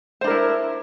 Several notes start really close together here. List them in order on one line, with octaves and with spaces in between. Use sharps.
C5 D4 A#4 E4